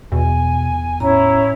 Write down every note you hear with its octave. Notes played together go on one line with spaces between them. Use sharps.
E2 B2 G#5
A2 C#4 E4 C#5 A#5